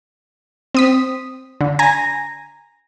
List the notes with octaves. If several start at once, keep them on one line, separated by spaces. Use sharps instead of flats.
C4 D#6 B6
D3
G#5 A#5 A#6